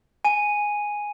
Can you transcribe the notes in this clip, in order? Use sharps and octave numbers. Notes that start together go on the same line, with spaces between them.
G#5 D#7